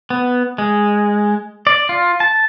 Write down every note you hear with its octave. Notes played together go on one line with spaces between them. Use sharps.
B3
G#3
D5
F4
A5